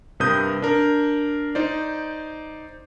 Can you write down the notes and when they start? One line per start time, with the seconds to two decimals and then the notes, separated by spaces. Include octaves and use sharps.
0.20 G2 C3 A#4 B4 D#6 G6
0.62 D4 A#4
1.55 D#4 C5 D5